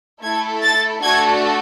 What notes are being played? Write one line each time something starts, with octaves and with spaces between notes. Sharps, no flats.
A3 E4 A4 G#6
A6
A3 D4 F#4 A4 G#6